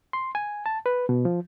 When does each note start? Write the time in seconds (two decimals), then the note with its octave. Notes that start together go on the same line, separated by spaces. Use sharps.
0.13 C6
0.35 G#5
0.66 A5
0.86 B4
1.09 B2
1.25 F3